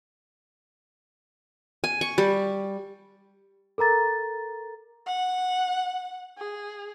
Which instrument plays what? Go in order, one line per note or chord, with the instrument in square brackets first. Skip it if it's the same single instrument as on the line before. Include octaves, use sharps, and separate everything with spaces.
[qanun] G#5
C#6
G3
[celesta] A4 A#4 A#5 A6
[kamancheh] F#5
G#4